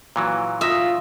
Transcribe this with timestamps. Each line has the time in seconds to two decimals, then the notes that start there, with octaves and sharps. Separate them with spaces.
0.16 A#2 E3 F#3
0.61 F4 E5 D#6 A#6